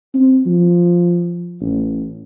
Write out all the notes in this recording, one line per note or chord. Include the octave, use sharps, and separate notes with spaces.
C4
F3
A1